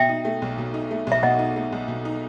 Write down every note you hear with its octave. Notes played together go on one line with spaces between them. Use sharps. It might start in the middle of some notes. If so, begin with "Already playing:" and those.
Already playing: B2 E5 G5
D#4
A3
B1
B2
D#4
A3
B1 E5
B2 D#5 F#5
D#4
A3
B1
B2
D#4